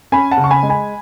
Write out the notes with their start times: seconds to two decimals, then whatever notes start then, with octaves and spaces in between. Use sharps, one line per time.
0.12 C#4 G#5 B5
0.31 F#5 A5
0.37 C#3
0.44 C#6
0.51 G#5 B5
0.63 G#3
0.69 G#5 B5